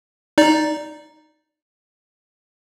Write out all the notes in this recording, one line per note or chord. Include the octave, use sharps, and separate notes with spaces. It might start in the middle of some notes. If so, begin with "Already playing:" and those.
D#4 D5